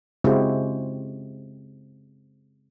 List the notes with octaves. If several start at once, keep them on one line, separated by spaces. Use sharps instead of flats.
C#3 G#3 C4 E4 F#4 G4